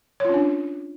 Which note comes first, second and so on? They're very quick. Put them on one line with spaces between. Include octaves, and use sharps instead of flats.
C#5 F4 C#4 D4